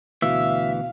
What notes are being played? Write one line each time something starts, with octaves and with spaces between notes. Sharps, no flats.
D2 B2 E3 E5 F5